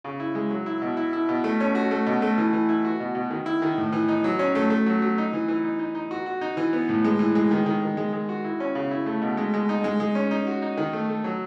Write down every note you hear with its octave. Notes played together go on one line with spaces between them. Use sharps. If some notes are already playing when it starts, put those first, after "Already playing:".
C#3
E4
G#3
F#3
E4
B2
E4
E4
B2
A3
C#4
F#4
A3
B2
A3
E3
E3
E4
F#4
B2
B2
D#3
E4
D#3
A2
E3
D#4
F#3
C#4
A3
A3
F#3
F#3
D#4
E3
E3
D#4
D#4
D#4
F#4
F#4
D#4
E3
B3
A2
G#3
E3
G#3
D#3
D#3
D#3
G#3
G#3
F#4
E4
C#4
C#3
E4
A3
B2
G#3
G#3
D#4
G#3
G#3
C#4
D#4
F#4
D#4
D#3
A3
A3
F#3